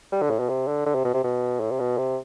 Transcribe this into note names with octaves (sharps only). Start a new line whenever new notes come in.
G3
D3
A2
B2
C3
D3
D3
C3
B2
C3
B2
A2
C3
B2
C3